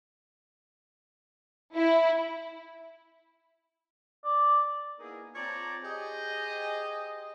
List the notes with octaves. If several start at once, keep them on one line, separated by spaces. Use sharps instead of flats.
E4
D5
A#3 B3 D#4 E4 G#4 A#4
C4 F4 C#5 D5 A5 A#5
G4 G#4 C5 D#5